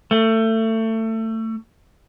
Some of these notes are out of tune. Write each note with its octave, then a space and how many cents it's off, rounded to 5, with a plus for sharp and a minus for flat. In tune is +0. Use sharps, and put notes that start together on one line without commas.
A3 +25